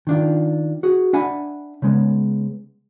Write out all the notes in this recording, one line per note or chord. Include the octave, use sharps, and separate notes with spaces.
D#3 D4 F4
F#4 G#4
D4 E5 F#5 G#5 B5
C#3 G#3 B3